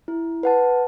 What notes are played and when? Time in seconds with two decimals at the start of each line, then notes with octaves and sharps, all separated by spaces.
0.08 E4
0.43 B4 F#5 A5